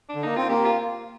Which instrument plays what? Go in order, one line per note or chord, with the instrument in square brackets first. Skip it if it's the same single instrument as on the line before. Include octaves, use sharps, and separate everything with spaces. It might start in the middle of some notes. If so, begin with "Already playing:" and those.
[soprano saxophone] D4
[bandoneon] D3
[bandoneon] A#3 [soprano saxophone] D#4
[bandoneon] C4 [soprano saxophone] F4
[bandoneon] A#3 [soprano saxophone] G4
[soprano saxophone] F4